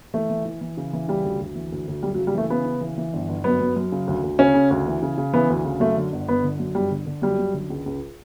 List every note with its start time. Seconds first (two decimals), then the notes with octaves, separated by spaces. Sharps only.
0.14 E3 A3
0.30 E3
0.45 E3
0.61 E3
0.77 C#3
0.93 E3
1.08 C#3 G3
1.24 D2
1.40 D2
1.55 E3
1.72 D2
1.87 D2
2.03 F#2 G3
2.14 F#3
2.19 C#3
2.27 G3
2.34 E3 A3
2.50 C#3 B3
2.66 C#3
2.81 E3
2.98 E3
3.13 G1
3.29 G1
3.44 F#2 B3
3.61 F#2
3.76 F#2
3.92 C#3
4.07 D2
4.23 D2
4.39 C#3 C#4
4.54 C#3
4.70 D2
4.86 E3
5.03 C#3
5.18 C#3
5.33 E3 B3
5.50 D2
5.65 C#3
5.80 F#2 A3
5.96 D3
6.12 G1
6.28 G1 B3
6.44 D3
6.59 F#2
6.75 G1 G3
6.91 D3
7.07 D3
7.22 F#2 G3
7.38 F#2
7.54 D3
7.70 C#2
7.86 C#2